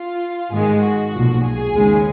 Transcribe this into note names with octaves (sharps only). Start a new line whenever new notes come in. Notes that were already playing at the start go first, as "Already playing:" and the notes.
Already playing: F4
G#2 D#3 G#3 G#4
F#4
B1 A#2 F3
G#4
D#2 C#3 G#3